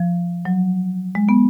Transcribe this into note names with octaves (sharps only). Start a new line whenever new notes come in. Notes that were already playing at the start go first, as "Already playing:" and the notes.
Already playing: F3
F#3
G#3
B3